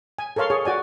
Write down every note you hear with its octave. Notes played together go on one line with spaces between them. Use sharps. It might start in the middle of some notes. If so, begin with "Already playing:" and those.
G#5
A4 A#4 C#5 F5 C6
G#4 C#5
F#4 D5 G#5